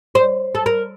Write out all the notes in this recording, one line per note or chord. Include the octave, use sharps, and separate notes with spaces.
C5
A4
A#4